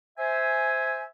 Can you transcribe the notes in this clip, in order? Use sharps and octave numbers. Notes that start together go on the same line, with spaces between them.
C5 E5 G#5